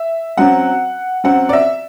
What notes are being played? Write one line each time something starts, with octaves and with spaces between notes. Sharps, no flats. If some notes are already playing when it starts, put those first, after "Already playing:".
Already playing: E5
F#2 F#3 C4 F#5
F#2 F#3 C4 F#5
D5
E5